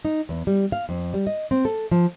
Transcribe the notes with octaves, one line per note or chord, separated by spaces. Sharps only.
D#4
E2
G3
F5
F2
G3
D#5
C4
A4
F3